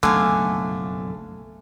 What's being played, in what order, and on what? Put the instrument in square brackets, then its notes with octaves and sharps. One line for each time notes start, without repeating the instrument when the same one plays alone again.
[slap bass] F#1 B1 F2 [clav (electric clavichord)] D3 [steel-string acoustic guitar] A3 [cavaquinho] F5 G#5